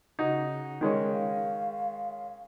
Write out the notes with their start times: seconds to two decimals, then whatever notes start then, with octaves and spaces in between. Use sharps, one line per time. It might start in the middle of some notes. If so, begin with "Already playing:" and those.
0.19 C#3 D#4 F#4
0.81 D#3 G#3 C#4
1.11 F5